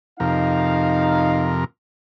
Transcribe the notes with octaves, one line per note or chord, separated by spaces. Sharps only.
F2 C3 D#4 A#4 F5